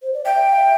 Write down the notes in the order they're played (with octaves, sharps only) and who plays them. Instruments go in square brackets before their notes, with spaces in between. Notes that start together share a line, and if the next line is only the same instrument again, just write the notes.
[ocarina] C5
D5
[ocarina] E5 [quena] G5
[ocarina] F5
E5